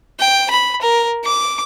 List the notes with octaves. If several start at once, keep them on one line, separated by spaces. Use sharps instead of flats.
G5
B5
A#4
D6